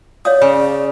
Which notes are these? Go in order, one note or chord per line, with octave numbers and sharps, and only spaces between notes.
C#5 D5 F5 D#6
C#3